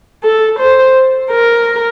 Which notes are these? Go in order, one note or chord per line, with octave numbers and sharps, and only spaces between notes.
A4
C5
A#4